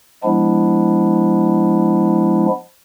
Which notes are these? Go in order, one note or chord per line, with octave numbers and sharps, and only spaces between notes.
F3 G#3 B3 D4 E4